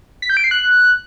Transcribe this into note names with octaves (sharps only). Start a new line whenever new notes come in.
B6
G6
D7
C7
F#6